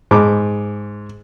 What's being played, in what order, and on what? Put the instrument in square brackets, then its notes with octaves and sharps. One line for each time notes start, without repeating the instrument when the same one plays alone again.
[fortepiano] G#2 D6